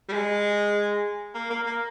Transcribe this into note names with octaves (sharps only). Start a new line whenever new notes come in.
G3
G#3
A#3
A#3
A#3